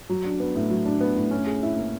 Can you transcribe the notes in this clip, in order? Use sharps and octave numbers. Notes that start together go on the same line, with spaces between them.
F#3
D4
B3
A2
F#3
D4
B3
A2
C#4
G#4
E4
A#3